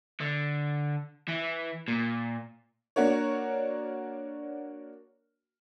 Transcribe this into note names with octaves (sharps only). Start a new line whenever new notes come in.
D3
E3
A#2
A#3 D4 F#4 A#4 C#5